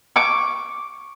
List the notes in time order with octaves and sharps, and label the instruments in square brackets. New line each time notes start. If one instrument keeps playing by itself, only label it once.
[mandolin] C#6 D6